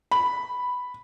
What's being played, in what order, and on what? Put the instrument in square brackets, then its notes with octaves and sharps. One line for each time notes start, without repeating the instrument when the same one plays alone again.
[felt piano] B5